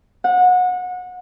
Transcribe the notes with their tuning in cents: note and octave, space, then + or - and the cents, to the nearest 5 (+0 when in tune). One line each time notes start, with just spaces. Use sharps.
F#5 -25